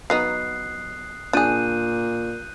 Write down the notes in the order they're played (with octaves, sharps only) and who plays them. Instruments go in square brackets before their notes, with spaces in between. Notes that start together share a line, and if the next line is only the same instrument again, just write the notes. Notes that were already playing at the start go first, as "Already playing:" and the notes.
[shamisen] F#3 B3 D#4 [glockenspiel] D#6 F#6 C7
[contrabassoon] A#2 [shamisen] D4 G#4 [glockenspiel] F#6 G6 D#7